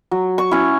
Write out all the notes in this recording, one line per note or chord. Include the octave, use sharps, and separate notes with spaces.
F#3
C#6
C#4 E4